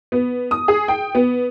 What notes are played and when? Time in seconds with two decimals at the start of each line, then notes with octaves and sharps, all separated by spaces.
0.12 B3
0.51 D#6
0.68 G#4
0.88 G5
1.15 B3